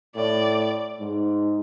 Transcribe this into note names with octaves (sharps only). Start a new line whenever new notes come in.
A2 D5
G#2